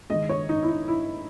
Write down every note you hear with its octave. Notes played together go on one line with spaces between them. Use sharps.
D#3 G#3 D#5
C#5
D#4
E4
D#4
E4